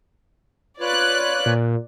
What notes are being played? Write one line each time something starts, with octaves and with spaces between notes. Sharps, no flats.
F4 B4 C#5 D5 F#6
A#2